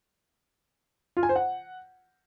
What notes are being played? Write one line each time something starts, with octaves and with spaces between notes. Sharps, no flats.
F4
G#5
C5
F#5